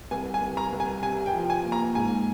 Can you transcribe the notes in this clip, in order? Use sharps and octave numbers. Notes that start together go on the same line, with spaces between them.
C2 G#5
G#5
C2
A#5
C2
G#5
C3 G#5
G5
F3
G#5
A#3
A#5
G#2 G#5